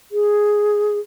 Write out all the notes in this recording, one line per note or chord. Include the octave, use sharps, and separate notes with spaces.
G#4